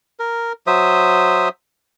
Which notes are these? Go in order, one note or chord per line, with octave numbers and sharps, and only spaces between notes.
A#4
F#3 C5 E5 D#6